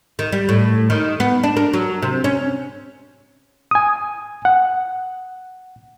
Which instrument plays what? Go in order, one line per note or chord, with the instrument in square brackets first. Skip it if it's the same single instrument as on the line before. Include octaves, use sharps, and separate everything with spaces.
[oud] D#3
G3
A2
D#3
B3
D4
A#4
F#3
C3
C#4
[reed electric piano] G#5 D#6
F#5